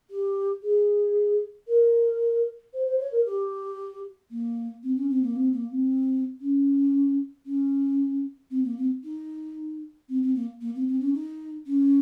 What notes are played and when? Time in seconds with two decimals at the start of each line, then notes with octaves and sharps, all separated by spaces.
0.10 G4
0.62 G#4
1.67 A#4
2.73 C5
2.85 C5
2.98 C#5
3.12 A#4
3.25 G4
4.30 A#3
4.83 C4
4.96 C#4
5.09 C4
5.22 A#3
5.35 C4
5.53 A#3
5.71 C4
6.41 C#4
7.46 C#4
8.50 C4
8.64 A#3
8.77 C4
9.03 D#4
10.09 C4
10.22 C4
10.35 A#3
10.61 A#3
10.75 C4
10.87 C4
11.00 C#4
11.13 D#4
11.66 C#4